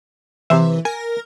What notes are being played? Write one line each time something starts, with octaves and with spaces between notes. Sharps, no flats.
C3 E3 C5 E5
A#4 G#5